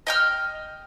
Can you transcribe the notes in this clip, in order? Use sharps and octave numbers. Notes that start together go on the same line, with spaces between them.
D#5 G5 F6